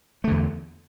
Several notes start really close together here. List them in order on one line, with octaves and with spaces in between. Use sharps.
A3 D3 E2